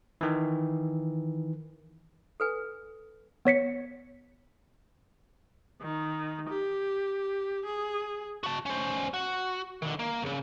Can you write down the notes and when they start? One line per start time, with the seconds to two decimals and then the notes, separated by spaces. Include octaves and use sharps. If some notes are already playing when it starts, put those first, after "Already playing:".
0.21 D#3 E3
2.40 A4 B4 G#5
3.45 B3 C#5 B6 C#7
5.81 D#3
6.49 G4
7.66 G#4
8.43 F#4 A5
8.66 C#4 C5
9.14 F#4
9.82 D3 D#3
9.99 A#3
10.22 B1 C#3